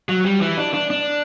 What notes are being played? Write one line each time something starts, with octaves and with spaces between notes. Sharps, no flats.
F#3
G3
E3
D4
D4
D4